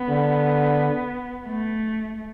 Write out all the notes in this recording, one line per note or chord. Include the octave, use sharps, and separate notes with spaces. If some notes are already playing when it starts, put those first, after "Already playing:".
Already playing: B3
D3
A3